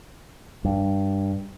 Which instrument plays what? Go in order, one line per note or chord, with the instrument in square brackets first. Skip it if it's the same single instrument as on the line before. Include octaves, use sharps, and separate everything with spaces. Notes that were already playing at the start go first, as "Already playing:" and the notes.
[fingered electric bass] G2